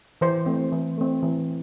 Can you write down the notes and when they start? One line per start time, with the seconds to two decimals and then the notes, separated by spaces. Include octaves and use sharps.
0.21 E3 C5
0.46 A3 C4
0.72 E3
0.98 A3 C4
1.23 E3